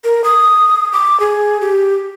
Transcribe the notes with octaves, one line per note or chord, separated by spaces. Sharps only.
A#4
D#6
D6
G#4
G4